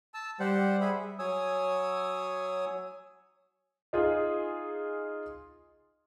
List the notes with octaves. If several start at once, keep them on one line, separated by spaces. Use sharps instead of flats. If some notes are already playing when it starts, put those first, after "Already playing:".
A5 E6
G3 G4 C5 F#5
G#4 E5 B5
F#3 C#5 G#5 D#6 E6
D#4 F4 G#4